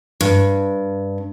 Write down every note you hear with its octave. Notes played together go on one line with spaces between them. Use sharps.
G2